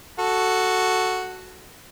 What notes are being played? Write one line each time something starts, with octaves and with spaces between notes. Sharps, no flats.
F#4 A4